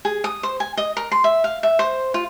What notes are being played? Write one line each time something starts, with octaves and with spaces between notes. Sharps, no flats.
G#4
D#6
C5
G#5
D#5
A#4
C6
E5
F5
E5
C5
F4